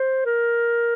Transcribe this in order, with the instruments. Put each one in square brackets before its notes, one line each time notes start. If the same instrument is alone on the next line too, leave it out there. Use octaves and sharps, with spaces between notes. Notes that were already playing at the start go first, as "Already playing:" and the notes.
Already playing: [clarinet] C5
A#4